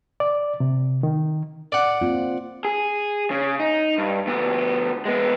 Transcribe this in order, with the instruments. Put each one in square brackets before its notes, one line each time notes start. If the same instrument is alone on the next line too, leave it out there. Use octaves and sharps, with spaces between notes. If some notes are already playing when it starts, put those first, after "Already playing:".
[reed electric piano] D5
C3
D#3
[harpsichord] D5 F#5
[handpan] A#3 C4 F4
[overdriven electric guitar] G#4
C#3
D#4
G2
D2 B3
G#3 B3